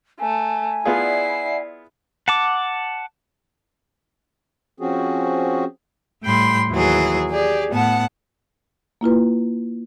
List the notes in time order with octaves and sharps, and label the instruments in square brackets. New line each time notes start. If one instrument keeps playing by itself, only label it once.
[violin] A3 [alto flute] G#5
[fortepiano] B3 F4 G#4 [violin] E4 C7 [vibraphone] D5 E5 F#5
[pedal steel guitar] F#5 A5 D6
[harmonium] F3 C4 C#4 F#4 G#4
[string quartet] A2 G3 G5 B5 C6
D#2 E3 F#3 G#4
G4 G#4 D5
A2 B3 F#5 A5
[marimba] A#3 E4 F4 B4